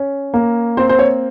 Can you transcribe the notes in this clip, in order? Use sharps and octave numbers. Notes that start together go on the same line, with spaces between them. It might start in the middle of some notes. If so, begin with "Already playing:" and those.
Already playing: C#4
A#3
C4 C5
C5
C#5